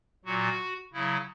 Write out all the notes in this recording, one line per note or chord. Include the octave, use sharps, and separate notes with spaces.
A#2 F#3 F#4
C#3 F#3 E4